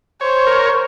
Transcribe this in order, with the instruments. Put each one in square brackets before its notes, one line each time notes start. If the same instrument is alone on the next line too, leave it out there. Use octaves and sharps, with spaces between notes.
[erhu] C5 [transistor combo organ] C#5
[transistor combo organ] A#4